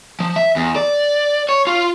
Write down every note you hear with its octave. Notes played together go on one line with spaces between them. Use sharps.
F3
E5
E2
D5
C#5
F4